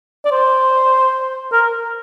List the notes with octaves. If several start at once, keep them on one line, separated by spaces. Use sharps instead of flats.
D5
C5
A#4